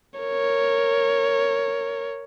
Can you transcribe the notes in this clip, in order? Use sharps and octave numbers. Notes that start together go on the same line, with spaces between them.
A#4 C#5